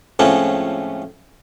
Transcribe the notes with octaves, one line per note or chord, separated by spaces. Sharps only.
C#2 A2 F3 A3 C4 C#4